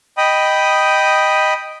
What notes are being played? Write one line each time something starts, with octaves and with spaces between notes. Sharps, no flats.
D#5 G5 B5 D#6